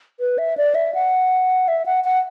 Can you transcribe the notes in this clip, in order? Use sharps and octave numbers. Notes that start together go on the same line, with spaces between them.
B4
E5
D5
E5
F#5
E5
F#5
F#5